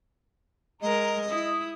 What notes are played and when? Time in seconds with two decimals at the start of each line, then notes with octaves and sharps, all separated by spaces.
0.82 G#3 A#4 D#5 A#5
1.29 E4 D#6